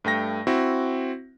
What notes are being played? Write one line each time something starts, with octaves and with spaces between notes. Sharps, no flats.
G2 A3 G5 A#6
C4 E4 F#4